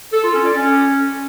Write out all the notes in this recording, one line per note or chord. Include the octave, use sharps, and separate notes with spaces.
A4
F4
C#4
D5
C#4